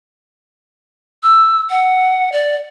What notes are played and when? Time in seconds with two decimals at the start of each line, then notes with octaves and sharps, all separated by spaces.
1.23 E6
1.70 F#5
2.32 D5